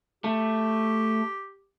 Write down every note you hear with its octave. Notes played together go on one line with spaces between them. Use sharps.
A3 G4